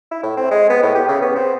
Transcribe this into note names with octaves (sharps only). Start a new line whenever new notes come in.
E4
A2
C4
G#3
B3
A2
G4
C#3
B3
C4